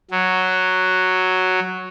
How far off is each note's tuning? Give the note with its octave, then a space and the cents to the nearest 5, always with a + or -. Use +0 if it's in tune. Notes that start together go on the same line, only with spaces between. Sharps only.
F#3 +0